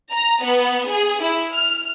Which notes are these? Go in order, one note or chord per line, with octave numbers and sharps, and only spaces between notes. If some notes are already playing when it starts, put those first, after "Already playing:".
A#5
B3
G#4
E4
F6